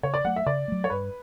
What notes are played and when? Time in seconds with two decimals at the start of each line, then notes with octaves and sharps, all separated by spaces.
0.03 C#3 C#5
0.14 D5
0.24 F#3 A3 F#5
0.36 E5
0.46 C#3 D5
0.68 F#3 A3
0.84 C#5
0.90 G2 B4